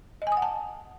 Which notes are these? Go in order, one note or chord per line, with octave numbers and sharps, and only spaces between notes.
D#5
G#5
D#6
F#5
A5